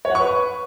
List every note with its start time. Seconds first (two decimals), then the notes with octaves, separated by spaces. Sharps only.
0.05 C#5
0.10 F#5
0.15 C#6
0.20 B4